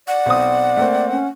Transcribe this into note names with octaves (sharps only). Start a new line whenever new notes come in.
D5 F#5
B1 C4 D#6
A3 A#3 C4
C#4